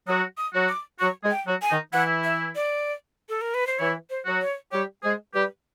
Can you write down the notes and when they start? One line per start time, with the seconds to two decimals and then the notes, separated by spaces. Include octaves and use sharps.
0.06 F#3 F#4 D#6
0.37 D#6
0.53 F#3 F#4
0.69 D6
0.99 F#3 F#4 C#6
1.23 G#3 G#4
1.31 G5
1.46 F#3 F#4
1.62 G#5
1.69 D#3 D#4
1.93 E3 E4 F#5
2.24 E5
2.55 D5
3.29 A4
3.41 A#4
3.54 B4
3.67 C5
3.79 E3 E4 C#5
4.10 C5
4.25 F#3 F#4
4.42 C#5
4.72 G3 G4 C#5
5.03 G#3 G#4 C5
5.34 G3 G4 B4